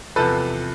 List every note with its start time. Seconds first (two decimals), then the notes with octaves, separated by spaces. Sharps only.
0.16 E2 C3 F3 A4 B4